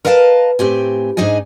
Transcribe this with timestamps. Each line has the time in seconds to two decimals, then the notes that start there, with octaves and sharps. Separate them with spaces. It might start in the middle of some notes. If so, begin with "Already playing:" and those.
0.05 A#4 B4 D#5 F5 F#5 A5
0.59 A2 C4 G4 G#5
1.17 G#2 D4 D#4 G#4 D#5 G#5